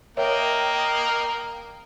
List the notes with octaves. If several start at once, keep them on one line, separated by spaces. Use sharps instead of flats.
A#3 A#4 C#5 D#5 E5 G5